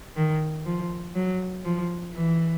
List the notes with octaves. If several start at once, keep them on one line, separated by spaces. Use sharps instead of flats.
D#3
F3
F#3
F3
E3